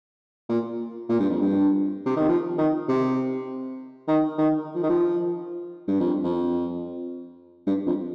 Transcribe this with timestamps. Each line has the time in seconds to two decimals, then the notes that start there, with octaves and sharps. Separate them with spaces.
0.49 A#2
1.09 A#2
1.20 G2
1.30 F2
1.41 G2
2.06 C3
2.17 D#3
2.29 F3
2.58 D#3
2.88 C3
4.08 D#3
4.38 D#3
4.75 F3
4.83 D#3
4.90 F3
5.88 G2
6.00 F2
6.24 F2
7.67 G2
7.86 F2